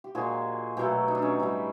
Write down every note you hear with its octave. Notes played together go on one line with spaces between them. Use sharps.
G4
A#2 F3 G#3 F#4 G#4
B2 F#3 A3 G4 A4
D#4
D4
C#4 D#4
A2 E3 G3